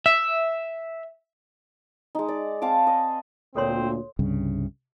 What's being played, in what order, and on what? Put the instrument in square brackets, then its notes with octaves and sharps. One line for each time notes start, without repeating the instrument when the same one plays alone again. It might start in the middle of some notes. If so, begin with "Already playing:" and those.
[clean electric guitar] E5
[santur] G#3 D#4
D5
C4 F5 A5 D6
D#5
[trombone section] D2 A#2 [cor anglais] C4 [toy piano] A4 C#5 C6
[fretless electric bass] C2 G2 C#3